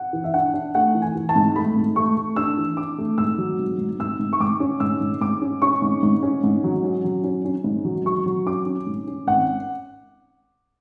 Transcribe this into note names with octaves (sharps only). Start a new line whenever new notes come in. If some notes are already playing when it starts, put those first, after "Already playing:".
Already playing: F#5
E3
E5
D4 F#5
D4
A3 F#5
E3
G#5
E3
A5
G#2
A3 B5
G#2
A3 C#6
A3
D4 E6
E3
D4 D6
A3
G#2 E6
F#3
G#2
G#2
G#2 E6
G#2
C#6
G#2 D6
C#4
G#2 E6
G#2
G#2 D6
C#4
C#4 C#6
G#2
G#2
C#4
G#2
F#3
C#4
F#3
C#4
C#4
G#2
F#3
F#3 C#6
F#3
C#4 D6
C#4
G#2
C#4
G#1 F#5